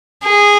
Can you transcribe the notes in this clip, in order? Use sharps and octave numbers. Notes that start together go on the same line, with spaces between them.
G#4